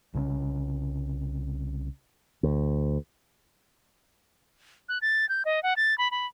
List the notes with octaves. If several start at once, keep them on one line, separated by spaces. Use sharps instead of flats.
C2 C#3 G#3 C#4
D2
F#6
A6
G6
D#5
F#5
A6
B5
B5